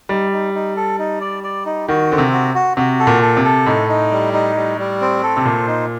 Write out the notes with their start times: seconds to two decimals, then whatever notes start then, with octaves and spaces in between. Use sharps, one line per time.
0.09 G3 D#4
0.32 D#4
0.54 D#4
0.76 A4
0.99 D#4
1.21 D5
1.43 D5
1.66 D#4
1.88 D#3 F#4
2.10 D3 C4
2.18 C3
2.32 F#4
2.55 F#4
2.77 C3 F#4
3.00 A4
3.07 A#2
3.22 A4
3.37 C3
3.44 A4
3.66 A2 D#4
3.89 D#4
4.11 G3
4.33 D#4
4.56 G3
4.78 G3
5.01 C4
5.23 A4
5.37 C3
5.45 A#2 C5
5.67 D#4